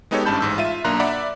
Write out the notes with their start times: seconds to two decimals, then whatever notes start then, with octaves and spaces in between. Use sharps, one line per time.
0.11 G#3 B3 D#4 G4 A4 C#5
0.25 G#1 G2 C#4 A5 B5 G6
0.41 A1 G#2 E6
0.58 F4 E5 D#7
0.84 B1 A#3 D4 A#5 C6 F#6
1.00 D5 E5 F#5 B5 D6